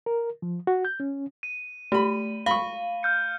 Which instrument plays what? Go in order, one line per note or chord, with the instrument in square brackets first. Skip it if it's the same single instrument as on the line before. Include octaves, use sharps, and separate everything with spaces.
[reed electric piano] A#4
F3
F#4
G6
C#4
[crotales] D#7
[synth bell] A3 [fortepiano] G4 B5
[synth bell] F5 [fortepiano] B5 C#6
[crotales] F6 G6 C#7